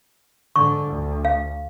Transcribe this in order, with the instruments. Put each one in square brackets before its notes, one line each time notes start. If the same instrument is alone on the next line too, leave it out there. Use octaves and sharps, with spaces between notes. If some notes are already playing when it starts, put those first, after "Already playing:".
[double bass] G#2 D3 [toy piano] C#6
[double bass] D2
[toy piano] F5